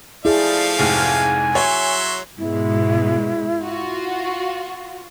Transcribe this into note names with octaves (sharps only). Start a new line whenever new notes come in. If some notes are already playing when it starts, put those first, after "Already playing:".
F3 A3 E4 G#4 D5 F5
F1 G#2 G#5 F6
F#3 C#5 E5 C6
G#2 B2 G#3 E4
F4 F#4